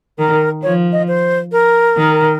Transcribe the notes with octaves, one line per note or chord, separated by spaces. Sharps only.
D#3 A#4
F3 C#5
D#5
C5
A#4
D#3